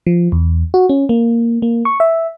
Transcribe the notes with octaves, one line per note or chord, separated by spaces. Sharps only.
F3
E2
F#4
C#4
A#3
A#3
C#6
E5